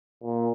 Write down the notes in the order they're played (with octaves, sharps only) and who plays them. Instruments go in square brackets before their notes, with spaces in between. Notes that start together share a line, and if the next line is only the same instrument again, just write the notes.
[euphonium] A#2